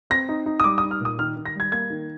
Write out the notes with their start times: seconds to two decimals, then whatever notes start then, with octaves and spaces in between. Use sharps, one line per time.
0.10 C4 A#6
0.29 D#4
0.46 D#4
0.60 D#6
0.64 G3 D6
0.78 D#6
0.83 D#4
0.91 F6
1.01 A#2 D#6
1.19 D#3 F6
1.36 D#3
1.45 A#6
1.55 G3 G#6
1.72 A#3 G#6
1.90 D#3